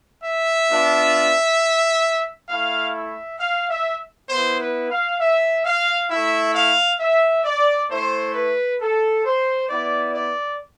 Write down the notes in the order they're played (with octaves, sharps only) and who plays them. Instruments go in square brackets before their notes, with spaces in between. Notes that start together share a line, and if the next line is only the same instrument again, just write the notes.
[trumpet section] E5
B3 D4 F4
A3 E4 F5
E5
F5
E5
B3 E4 C5
B4
F5
E5
F5
A3 E4 E5
F5
E5
D5
A3 E4 C5
B4
A4
C5
B3 E4 D5
D5